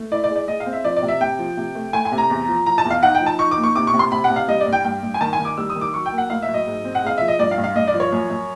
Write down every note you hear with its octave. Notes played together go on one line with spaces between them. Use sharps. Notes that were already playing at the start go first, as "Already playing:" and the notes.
Already playing: A3
E4 D5
D5
G#3
D5
G#3 D#5
F5
C4
E5
F3 D5
D5
C3
E5
C3 G5
F3
C3
A3
A3 G#5
G#5
C3
A#5
E2
F3
F3 A#5
A5
E2
F5
D#4 F#5
G5
F3
A5
D#4 C#6
D6
A#2
C#6
C3 D6
C#6
C3
C6
C3 B5
F#5
C3
F5
G3 D#5
D5
G2
G5
G2 G5
G2
G#5
D#3 A5
G#5
D#3
D6
G3 E6
D#6
D#3
D6
F#3 C#6
G5
A#3
F#5
A2 F5
E5
F#3
D#5
G#2
C4
F#5
G#3 F5
F3 E5
D#5
G2 D5
F5
G2
F5
G2 D#5
D5
F3
C#5
F#2
F#2